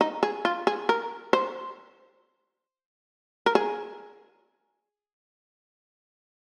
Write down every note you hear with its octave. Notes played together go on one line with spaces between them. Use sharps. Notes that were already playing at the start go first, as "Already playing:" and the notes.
D#4
G#4
F4
G#4
A#4
C5
A#4
G#4